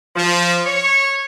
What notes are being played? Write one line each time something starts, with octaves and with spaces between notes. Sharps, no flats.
F3
C#5